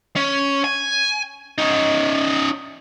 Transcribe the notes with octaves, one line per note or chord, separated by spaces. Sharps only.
C#4
G#5
C#4 D#4